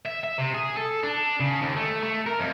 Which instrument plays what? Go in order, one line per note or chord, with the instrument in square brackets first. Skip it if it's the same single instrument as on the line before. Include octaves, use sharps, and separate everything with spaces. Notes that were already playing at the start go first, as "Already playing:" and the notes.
[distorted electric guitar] E5
E5
C3
G#4
A4
D4
C#3
D#2
A3
A3
A#4
F2